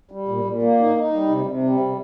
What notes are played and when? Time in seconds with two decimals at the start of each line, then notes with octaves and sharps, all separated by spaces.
0.11 G3
0.28 A#2
0.45 A#2
0.62 A#3
0.79 D#4
0.96 D#4
1.12 G3
1.29 C3
1.46 C3
1.63 G3
1.80 C3